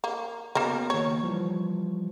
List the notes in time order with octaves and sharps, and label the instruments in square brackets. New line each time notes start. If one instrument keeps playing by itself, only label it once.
[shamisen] A#3
[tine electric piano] C#3 B3 F#4 [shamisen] A#3 A#4
[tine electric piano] D#3 A#3 [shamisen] C#5
[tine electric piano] E3 F3 G3